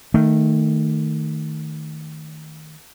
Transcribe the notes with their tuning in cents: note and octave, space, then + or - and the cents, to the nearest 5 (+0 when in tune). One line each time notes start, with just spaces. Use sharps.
D#3 +0 A3 +15